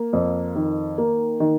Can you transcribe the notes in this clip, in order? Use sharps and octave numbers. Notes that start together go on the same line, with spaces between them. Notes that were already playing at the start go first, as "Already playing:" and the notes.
Already playing: A#3
F2
D#3
A#3
D#3